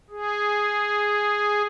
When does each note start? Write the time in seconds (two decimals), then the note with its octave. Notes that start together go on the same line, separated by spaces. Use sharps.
0.10 G#4